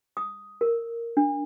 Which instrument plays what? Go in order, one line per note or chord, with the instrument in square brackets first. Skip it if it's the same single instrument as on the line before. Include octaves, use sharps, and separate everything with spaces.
[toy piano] D#6
A#4
D4